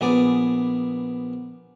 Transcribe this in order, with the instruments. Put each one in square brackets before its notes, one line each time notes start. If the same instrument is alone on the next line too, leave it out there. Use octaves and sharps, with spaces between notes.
[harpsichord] A#1 B3 G#4 D5